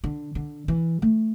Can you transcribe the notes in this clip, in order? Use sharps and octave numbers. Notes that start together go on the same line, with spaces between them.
D3
D3
E3
A3